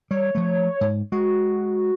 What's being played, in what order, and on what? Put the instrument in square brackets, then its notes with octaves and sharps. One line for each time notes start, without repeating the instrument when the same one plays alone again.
[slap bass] G3 [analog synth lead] C#5
[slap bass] F3 A3
G#2
[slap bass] G#3 [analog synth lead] F#4